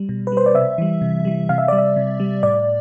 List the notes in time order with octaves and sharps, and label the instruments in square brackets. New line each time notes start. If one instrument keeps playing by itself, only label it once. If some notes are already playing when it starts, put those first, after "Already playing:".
Already playing: [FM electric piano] G3
B2
B4
G3 C5
D5
C3 E5
E3 G3
C3
E3 G3
C3 F5
E5
G3 D5
E5
C3
G3
A2 D5